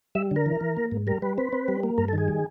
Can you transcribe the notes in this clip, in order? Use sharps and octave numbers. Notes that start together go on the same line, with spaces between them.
G3 E5
D3 A#4
E3
E3
A#3
G#2
G3 A#4
G3 B4
C4 B4
C4
G3
A#3
G2 A#4
A4
D#3 G#4
G3